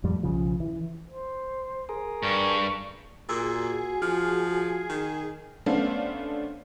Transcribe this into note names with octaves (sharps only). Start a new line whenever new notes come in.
F2 A2 G3
B1 C#3 F3
E3
C5
G#4 A#4
G2 C#6
A#2 F#4 G#4 E6
F3 F6
D#3
A3 B3 C#4 D4 C5 F5